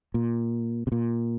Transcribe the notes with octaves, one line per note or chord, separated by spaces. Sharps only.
A#2
C3
A#2